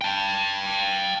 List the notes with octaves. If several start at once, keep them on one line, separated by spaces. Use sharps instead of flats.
G5 A5